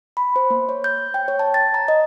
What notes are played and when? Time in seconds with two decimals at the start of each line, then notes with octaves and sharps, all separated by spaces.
0.17 B5
0.36 C5
0.50 A#3
0.69 C#5
0.84 G6
1.14 G5
1.28 C#5
1.39 A5
1.54 A6
1.74 A#5
1.88 D#5